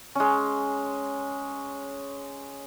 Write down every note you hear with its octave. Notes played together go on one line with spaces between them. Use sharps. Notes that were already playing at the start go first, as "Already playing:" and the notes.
G#3 C#4